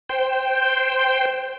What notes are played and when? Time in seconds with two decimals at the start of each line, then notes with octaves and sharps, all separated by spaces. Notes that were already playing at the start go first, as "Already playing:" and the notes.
0.09 C5 G5